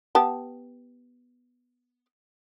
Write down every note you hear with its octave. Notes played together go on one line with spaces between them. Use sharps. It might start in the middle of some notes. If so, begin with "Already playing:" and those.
B3 G4 A5